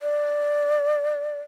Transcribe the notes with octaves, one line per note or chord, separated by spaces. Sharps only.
D5